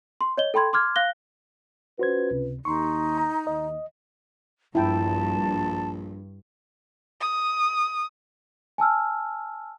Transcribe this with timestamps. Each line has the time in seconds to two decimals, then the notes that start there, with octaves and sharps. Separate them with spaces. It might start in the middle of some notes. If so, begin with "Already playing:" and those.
0.21 C6
0.37 C#5 D#5 G7
0.54 A4 G5 B5 C6 G#6
0.73 C6 D6 F6 G#6
0.96 F5 F#6 A#6 G7
1.99 C#4 F4 F#4 B4 C5 G#6
2.31 C#2 C3
2.65 D#2 D#4 C6 C#6
3.18 A#5
3.47 D#2 D#5
4.75 A#1 G2 E4 G5 A5
7.21 D#6
8.78 G#5 A5 E6 F6